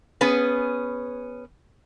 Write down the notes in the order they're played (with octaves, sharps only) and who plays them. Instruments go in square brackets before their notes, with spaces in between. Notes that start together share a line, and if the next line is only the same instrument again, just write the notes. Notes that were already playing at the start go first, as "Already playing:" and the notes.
[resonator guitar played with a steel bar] B3 C#4 G#4 B4